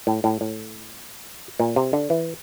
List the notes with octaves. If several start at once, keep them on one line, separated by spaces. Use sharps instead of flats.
A2
A2
A2
A#2
C3
D3
E3